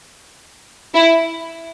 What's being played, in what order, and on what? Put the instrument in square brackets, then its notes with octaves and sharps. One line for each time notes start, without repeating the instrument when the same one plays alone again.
[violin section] E4